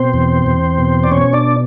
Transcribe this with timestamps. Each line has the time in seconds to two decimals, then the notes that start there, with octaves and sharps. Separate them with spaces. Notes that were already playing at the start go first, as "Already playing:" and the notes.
Already playing: B2 C4 C5
0.13 E2
0.46 E2
0.78 B2
1.03 D5
1.11 B2 C#4 C#5
1.33 D4 D5